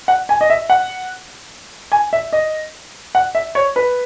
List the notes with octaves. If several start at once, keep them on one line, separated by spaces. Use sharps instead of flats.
F#5
G#5
D#5
E5
F#5
G#5
E5
D#5
F#5
E5
C#5
B4